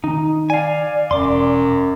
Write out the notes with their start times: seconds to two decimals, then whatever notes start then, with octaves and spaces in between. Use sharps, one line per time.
0.04 D#3 D#4
0.50 D5 F5 G#5
1.11 E1 F#2 C6 D6